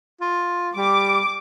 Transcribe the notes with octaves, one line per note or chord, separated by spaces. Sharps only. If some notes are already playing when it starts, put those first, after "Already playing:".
F4
G3 D6